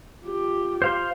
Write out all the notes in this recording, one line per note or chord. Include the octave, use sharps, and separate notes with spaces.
F4 G4
C5 F5 C6